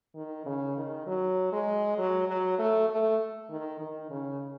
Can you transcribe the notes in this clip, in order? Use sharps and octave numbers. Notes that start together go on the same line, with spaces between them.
D#3
C#3
D#3
F#3
G#3
F#3
F#3
A3
A3
D#3
D#3
C#3